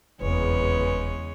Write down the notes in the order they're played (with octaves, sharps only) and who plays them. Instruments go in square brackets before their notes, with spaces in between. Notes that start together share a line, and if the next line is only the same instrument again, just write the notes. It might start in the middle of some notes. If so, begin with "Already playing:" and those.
[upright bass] F1 [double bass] E2 [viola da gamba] C#3 G#3 C#5 [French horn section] B4